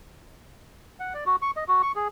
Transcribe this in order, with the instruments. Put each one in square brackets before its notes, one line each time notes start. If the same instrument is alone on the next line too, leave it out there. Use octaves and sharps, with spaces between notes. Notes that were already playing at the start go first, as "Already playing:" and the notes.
[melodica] F#5
D5
F#4
C#6
D#5
F#4
C#6
G#4